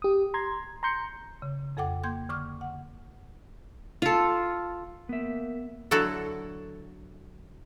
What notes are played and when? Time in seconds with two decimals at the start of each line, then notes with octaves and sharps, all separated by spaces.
0.02 G4 D#6
0.34 A#5 C6 G#6
0.83 A#5 C6 G6 C#7
1.42 C#3
1.77 F2 A4 F#5 G5 D6
2.04 A#3 G5 C6 G6 G#6
2.29 D3 C#6 D6 F6
2.61 F#5
4.02 F4 A4
5.09 A#3 B3 E5
5.91 D3 F#3 E4 F#4 A4